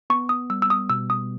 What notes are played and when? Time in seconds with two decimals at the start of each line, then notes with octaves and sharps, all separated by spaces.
0.10 B3 C#6
0.29 D#6
0.50 G3 E6
0.62 E6
0.70 D#6
0.90 B2 E6
1.10 D#6